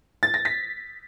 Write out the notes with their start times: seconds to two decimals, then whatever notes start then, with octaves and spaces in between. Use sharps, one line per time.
0.23 A6
0.34 A#6
0.45 B6